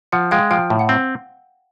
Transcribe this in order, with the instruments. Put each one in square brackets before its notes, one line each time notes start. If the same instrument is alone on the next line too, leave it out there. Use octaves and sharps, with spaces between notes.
[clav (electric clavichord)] F3 [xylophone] F#5
[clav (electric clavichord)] G#3 [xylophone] F5 G5
[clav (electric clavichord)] F3 [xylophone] F5 G5
[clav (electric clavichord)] A2
[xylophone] F#5
[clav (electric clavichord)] C4